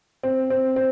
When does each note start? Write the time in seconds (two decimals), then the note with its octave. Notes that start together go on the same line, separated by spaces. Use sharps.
0.23 C4
0.50 C4
0.76 C4